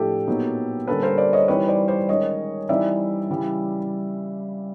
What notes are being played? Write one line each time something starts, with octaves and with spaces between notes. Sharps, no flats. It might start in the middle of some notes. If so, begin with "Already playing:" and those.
Already playing: A2 F3 A3 D4 G4 A4
A#2 F#3 B3 D#4
D3 G3 A#3 C#4 A4 B4
A#4 C5
C5 D5
C#5 D#5
E3 G3 C4 D#4 B4 C#5
C5 D5
C5 D5
D#3 G#3 C#4 C#5 D#5
E3 G3 C4 D#4 D5 E5
C#3 E3 G3